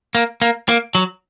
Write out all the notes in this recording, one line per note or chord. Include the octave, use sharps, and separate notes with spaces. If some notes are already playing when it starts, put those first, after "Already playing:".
A#3
A#3
A#3
F#3